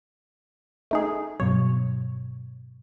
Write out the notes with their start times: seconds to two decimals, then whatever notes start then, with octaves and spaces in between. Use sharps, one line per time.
0.91 A3 D#4 G#4
1.40 G2 B2 F#3 C#5